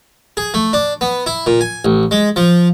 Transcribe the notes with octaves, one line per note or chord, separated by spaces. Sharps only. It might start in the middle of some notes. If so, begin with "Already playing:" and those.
G#4
A3
D4
B3
E4
A#2
G#5
A1
G#3
F3